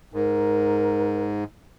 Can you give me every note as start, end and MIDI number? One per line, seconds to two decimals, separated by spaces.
0.14 1.44 44
0.14 1.24 70